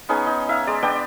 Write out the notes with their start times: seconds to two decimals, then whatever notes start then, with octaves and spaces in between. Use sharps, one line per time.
0.09 B3 C#4 D#4 G#4
0.27 D#4
0.48 D#4 E5 F5
0.67 G#3 D5
0.82 B3 D4 D5 G5